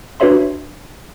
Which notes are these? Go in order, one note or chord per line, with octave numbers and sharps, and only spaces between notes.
D4 F#4 B4 C#5 E5 C6